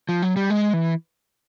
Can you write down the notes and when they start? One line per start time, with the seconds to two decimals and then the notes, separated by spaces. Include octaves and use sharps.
0.09 F3
0.22 F#3
0.36 G3
0.50 G#3
0.73 E3